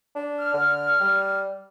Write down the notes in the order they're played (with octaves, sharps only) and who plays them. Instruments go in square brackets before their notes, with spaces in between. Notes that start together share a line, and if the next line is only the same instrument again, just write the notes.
[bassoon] D4
[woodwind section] F6
[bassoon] D3
G3